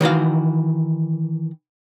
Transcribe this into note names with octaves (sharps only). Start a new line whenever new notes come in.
D#3 E3 F#4 F5